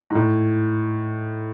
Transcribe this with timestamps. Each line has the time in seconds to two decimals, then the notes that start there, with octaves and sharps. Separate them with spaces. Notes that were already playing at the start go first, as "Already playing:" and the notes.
0.10 G#2
0.15 A2